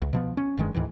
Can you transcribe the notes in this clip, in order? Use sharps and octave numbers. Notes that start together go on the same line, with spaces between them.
C#2
B2 F3 B3
C#4
F1 G2 D#3 G#3
D2 G#2 D#3 E3